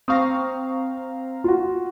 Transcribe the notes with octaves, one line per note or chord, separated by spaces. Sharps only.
C4 F5 A#5 C#6 D#6
F4 F#4